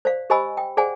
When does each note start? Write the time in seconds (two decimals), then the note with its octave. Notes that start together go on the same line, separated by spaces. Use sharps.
0.05 C5 D5 F5
0.30 G4 C5 D#5 G#5 B5 E6
0.57 G5
0.77 G#4 C5 D5 F#5 G#5